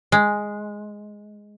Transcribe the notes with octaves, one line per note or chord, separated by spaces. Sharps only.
G#3